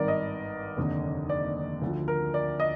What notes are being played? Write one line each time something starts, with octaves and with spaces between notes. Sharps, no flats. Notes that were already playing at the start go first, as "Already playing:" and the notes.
Already playing: G#1 G2 D#3 A#4 D5
D#5
F1 D#2 D3
D5
D2 D3 F3
A#4
D5
D#5